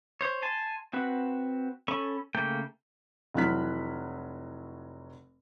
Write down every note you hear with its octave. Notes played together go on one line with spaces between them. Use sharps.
C5 C#5
G#5 A5 C6
C4 F#4 B4
C#4 A4 B5 C#6
C#3 A3 A#3 G5
F1 E3 F#3 F6 F#6 B6